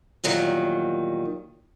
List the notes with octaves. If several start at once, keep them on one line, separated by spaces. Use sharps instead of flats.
E2 A#2 D#3 F#3 G3